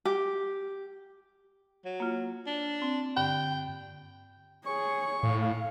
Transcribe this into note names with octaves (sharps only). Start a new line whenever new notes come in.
G4
F#3
A#3 F4
D4
C4
G2 D3 G5
G#4 C#5 C#6
A2 F5